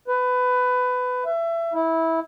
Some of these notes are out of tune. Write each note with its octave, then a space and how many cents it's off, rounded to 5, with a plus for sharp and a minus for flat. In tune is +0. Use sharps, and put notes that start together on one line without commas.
B4 +20
E5 +25
E4 -15